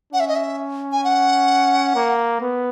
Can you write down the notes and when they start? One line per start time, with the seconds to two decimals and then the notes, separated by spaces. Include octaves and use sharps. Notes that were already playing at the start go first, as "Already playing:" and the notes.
0.13 C#4 F#5
0.20 E5
0.28 D#5
0.35 E5
0.92 G#5
1.04 F#5
1.96 A#3
2.41 B3